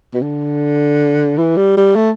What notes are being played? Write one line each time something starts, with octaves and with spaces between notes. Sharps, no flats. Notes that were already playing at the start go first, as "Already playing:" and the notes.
B2
D3
E3
G3
G3
A3